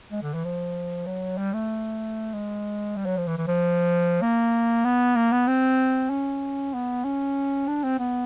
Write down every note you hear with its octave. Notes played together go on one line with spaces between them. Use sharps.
G#3
D3
E3
F3
F#3
G3
A3
G#3
G3
F#3
F3
E3
E3
F3
A#3
B3
A#3
B3
C4
C#4
B3
C#4
D4
C4
B3